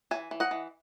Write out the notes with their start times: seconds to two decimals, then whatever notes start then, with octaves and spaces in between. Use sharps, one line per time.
0.11 E3 E5 G#5
0.31 E3
0.40 D#5 F#5
0.51 E3